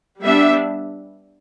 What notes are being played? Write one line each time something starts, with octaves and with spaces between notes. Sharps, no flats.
G3 B3 D4 E5